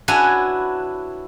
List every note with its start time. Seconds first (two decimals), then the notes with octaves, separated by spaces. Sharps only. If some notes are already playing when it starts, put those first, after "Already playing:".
0.08 D4 E4 F#4 B4 C#5 G#5